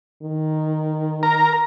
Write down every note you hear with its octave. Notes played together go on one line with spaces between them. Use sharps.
D#3
A#4 A#5